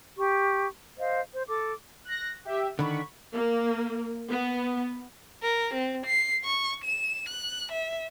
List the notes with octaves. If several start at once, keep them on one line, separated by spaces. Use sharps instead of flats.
G4 C#6
C5 D#5 F5
C5
A4 D6
F#6 A#6
G4 E5
D3 D#3 B5 C#6
A#3
B3
A#4
C4
C7
C#6
E7
F#6
E5